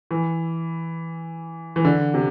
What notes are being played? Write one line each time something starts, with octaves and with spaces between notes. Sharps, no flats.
E3
E3
D3
C3